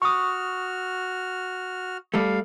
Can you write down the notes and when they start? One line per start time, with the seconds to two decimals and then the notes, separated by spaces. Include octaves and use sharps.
0.02 F#4 C#6 D#6 F6
2.14 G3 A3 F5